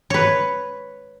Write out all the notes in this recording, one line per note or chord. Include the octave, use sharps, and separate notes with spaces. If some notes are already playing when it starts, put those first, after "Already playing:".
B4 C#5